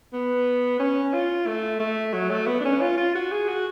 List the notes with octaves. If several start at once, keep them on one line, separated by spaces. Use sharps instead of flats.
B3
C#4
F4
A3
A3
F#3
A3
B3
D4
C#4
F4
F4
F#4
G#4
F#4